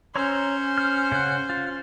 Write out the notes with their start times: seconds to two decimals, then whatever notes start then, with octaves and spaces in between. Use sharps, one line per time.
0.16 C#4 C5 C#5 A#5 E6
0.78 F6
1.12 C#3 F#5
1.50 F4